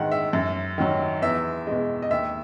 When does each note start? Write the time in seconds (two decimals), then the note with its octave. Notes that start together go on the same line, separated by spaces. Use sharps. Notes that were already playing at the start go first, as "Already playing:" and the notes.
Already playing: G#2 D#3 G#3 F#5
0.12 E5
0.33 F#2
0.78 D#3 F#3
1.22 E2 E5
1.67 B2 G#3 D#5
2.02 D#5
2.10 D#2 E5